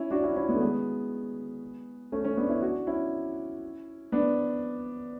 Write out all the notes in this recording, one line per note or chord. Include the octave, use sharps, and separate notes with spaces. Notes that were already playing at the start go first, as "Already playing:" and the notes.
Already playing: C#4 E4
D4 F#4
C#4 E4
C#4 E4
B3 D4
A3
G#3 B3
A3 C#4
A3 C#4
B3 D4
C#4 E4
D4 F#4
C#4 E4
B3 D4